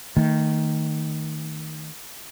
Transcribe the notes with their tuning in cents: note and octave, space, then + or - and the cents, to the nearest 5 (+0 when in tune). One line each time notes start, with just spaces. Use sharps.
D#3 +0 A3 +35